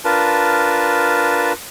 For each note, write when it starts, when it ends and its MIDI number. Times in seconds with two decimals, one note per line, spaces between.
0.05 1.53 62
0.05 1.53 65
0.05 1.53 70
0.05 1.53 71
0.05 1.53 81